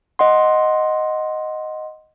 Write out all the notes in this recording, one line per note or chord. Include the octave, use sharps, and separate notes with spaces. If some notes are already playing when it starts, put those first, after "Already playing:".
D#5 F#5 C6